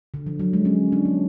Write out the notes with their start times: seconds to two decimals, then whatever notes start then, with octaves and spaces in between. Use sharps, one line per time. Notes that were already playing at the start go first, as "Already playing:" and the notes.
0.14 D3
0.26 F3
0.39 F#3
0.53 G#3
0.65 C#4
0.92 D4
1.05 B3